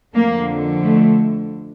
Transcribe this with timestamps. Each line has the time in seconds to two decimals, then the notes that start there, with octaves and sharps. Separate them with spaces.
0.15 F2 D3 A#3
0.83 A3